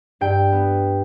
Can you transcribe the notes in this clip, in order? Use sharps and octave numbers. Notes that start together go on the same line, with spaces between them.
G2 G5
B3